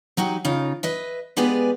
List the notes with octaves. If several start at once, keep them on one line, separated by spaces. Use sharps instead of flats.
F#3 D#4 F#4 G4
C#3 D#4 F4
B4 D#5 E5
G#3 B3 G4 G#4 B4 D5